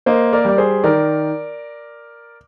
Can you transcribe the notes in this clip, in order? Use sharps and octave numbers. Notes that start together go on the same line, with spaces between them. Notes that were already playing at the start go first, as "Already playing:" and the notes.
A#3 C5 D#5
A#4 D5
G3 D5
G#4 C5
D#3 A#4 D5